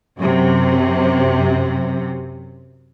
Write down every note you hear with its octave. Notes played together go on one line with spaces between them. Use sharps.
F#2 C3